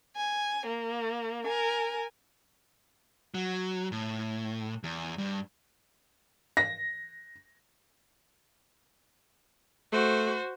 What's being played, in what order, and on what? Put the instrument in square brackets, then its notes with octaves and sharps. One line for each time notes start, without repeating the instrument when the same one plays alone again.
[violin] G#5
A#3
A#4 G#5
[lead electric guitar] F#3
A2
E2
G2
[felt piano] A#6
[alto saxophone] A3 [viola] F#4 C5